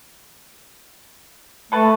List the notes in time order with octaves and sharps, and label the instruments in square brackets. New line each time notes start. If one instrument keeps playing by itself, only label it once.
[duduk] A3 [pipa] A4 B4 A5